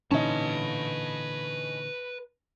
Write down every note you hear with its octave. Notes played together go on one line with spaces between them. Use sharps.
A#2 D3 E3 C#4 D#4 B4 A5